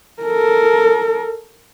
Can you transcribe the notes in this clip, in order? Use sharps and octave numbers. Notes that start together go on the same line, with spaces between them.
A4 A#4